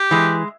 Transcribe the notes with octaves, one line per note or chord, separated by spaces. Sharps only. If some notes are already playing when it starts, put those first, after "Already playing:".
Already playing: G4
E3 G#3